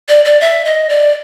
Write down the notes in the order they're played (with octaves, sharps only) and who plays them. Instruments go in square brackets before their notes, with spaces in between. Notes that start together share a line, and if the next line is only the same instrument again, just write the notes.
[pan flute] D5
D5
E5
D#5
D5